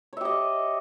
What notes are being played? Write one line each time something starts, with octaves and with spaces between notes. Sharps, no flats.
G4 C#5 D#5 E5